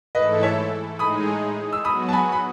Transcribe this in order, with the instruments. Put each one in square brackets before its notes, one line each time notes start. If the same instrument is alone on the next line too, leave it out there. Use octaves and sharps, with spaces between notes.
[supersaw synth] G#2 E3 A3 E4 A4 [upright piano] B4 D#5
[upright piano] C#5 E5
[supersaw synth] A2 G#3 D#4 G#4 [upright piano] B5 D#6
[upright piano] E6
[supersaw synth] F#3 B3 F#4 [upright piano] B5 D#6
[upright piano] A5
G#5 B5
B5